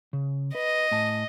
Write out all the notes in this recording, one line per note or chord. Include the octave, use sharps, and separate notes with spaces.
C#3
B4 D#5
A2 G#5 A5